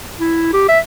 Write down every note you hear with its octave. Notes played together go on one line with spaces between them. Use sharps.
E4
G4
E5